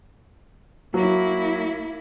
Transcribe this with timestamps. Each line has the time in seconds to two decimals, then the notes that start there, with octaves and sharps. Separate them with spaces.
0.94 F#3 A#3 E4